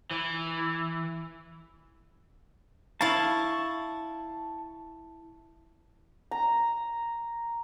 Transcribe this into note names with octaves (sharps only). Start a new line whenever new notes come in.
E3
E4 F5 A5 C#6
A#5